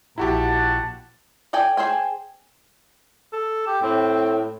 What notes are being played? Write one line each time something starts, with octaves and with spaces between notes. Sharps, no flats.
A#1 E4 F#4 G4 F#5 A5
A4 D5 G5 G#5
G#4 C5 G5 G#5
A4
G4
A2 C4